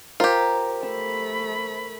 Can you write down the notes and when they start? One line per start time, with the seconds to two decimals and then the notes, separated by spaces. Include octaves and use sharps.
0.20 F4 G4 A#4 C5
0.83 A3 B5 E6